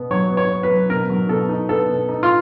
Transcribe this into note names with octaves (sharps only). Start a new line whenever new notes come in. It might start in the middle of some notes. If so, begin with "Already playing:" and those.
Already playing: B2 B3
F#3 C#5
B3
C#5
B3
B4
F#3
B2 A#4
F#3
B2 A4
D#4
B3 A4
B2
D#4
F4